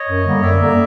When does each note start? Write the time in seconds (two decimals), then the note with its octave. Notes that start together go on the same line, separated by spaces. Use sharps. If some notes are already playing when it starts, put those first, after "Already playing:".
Already playing: C#5 D#5
0.08 F#2
0.25 D3 G3 A#3
0.42 F#2 D5 E5
0.59 D3 G3 A#3